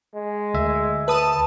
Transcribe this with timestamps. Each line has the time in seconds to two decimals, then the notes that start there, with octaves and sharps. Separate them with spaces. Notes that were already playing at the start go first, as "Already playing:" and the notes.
0.14 G#3
0.54 D2 E5
1.08 B4 A5 D#6 D#7